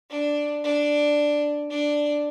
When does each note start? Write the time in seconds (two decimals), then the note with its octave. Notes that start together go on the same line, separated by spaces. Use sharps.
0.10 D4
0.64 D4
1.71 D4